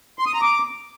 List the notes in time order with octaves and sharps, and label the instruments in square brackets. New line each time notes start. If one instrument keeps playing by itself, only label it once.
[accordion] C6
D#6
A#5
D6